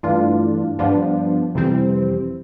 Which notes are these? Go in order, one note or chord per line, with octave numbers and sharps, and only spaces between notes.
G2 E3 A3 D4 F4
G2 F3 B3 D4 F4
F2 C3 E3 G3 C4